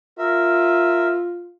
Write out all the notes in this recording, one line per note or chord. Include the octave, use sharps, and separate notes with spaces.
F4 A#4 E5